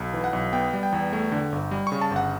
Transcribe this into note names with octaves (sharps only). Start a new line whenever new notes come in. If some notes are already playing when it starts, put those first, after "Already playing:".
Already playing: B1
E3
F#5
B1
B3 G5
G3
G5
E2
A3
D3
G1
G3
C#3 C#6
A5
G1
F#5